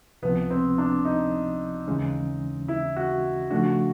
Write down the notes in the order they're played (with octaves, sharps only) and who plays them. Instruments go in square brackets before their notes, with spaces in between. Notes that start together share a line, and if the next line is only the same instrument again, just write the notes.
[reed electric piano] C#2 C3 F3 [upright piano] B3
[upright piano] C4
D4
D#4
[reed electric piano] D#2 C#3 E3 G#3 C#4
[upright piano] E4
F#4
[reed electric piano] C#3 F3 A3 D4 [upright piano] F#4